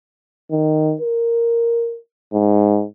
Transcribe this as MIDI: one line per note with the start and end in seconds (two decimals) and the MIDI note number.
0.51 0.94 51
1.01 1.97 70
2.33 2.84 44